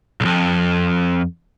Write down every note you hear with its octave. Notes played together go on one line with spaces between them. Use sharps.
B1 F2